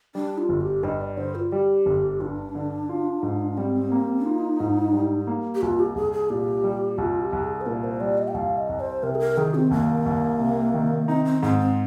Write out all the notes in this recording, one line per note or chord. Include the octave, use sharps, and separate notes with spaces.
G3 D4
F4
G1
G4
G2 D#5
D5
D3 C5
F4
G3 G4
G1
G2 D4
D3
F4
G#2
G3 C4
A#3
D#4 F4
G#2
G3
A#3
G4
C2 F4
G4
C2 G#4
G#4
A#2 G4
G3
C2 F4
G4
C2
G#4
C5
A#2 A#4
C5
G3 D5
D#5
G5
C2 F5
D#5
C2
C5
C3 A#4
G#4
A#4
D#3 G#4
C4
C2 A#3
C2
C3
D#3
C4 D#4
C4
G#2 C4
C4